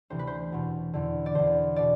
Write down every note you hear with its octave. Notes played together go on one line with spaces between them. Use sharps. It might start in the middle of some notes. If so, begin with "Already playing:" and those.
D2 C3 E3 C5
B4
C5
E2 B2
E2 D3
D5
E2 D3 C5
B2 D5